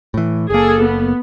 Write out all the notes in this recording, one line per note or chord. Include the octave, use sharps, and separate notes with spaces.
A2 E3
F#1 A#3 G#4 A4
B3